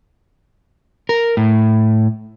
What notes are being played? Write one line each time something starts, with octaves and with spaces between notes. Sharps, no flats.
A#4
A2